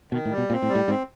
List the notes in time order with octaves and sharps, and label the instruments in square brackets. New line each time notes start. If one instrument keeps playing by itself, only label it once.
[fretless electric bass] B2 [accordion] D#3
[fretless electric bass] A2
[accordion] G3
[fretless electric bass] B2
[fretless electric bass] A#2 [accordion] C4
[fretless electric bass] A2
[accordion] G3
[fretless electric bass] A2
[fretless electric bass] G#2 [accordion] C4